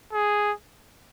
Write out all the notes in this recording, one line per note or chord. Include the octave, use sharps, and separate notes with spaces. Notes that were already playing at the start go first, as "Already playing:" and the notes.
G#4